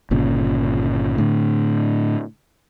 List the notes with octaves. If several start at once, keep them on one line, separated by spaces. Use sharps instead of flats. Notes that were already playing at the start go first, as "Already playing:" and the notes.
G1 A#2 C#3
A2 D3